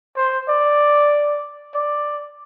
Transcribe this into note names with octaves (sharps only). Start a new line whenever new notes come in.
C5
D5
D5